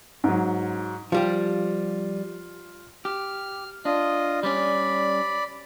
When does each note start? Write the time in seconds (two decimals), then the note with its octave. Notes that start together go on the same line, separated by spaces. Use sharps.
0.24 G#2 F#3
1.12 F3 G3 F4 G4
3.05 G4 F6
3.85 D4 F4 D#5
4.43 G3 C#4 D5 B5